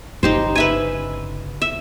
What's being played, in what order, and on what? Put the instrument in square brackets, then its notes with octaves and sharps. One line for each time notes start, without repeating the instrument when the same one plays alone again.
[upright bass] G1 C#3 [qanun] D#4 G4 C5
[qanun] B4 E5 G#5
E5